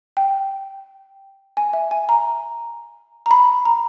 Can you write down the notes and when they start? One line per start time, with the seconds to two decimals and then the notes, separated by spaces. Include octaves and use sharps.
0.17 G5
1.57 G#5
1.73 E5
1.91 G#5
2.09 A#5
3.26 A#5
3.31 B5
3.65 A#5